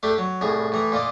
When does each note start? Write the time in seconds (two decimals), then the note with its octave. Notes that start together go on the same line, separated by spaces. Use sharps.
0.03 A3 D4 G4 A4
0.18 F#3
0.41 C2 A2 G#4
0.72 A2 E3 A#5
0.92 A#2 F4 D5 D#5